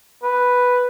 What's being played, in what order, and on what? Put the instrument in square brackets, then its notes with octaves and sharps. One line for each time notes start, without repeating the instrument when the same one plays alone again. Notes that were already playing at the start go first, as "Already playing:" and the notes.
[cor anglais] B4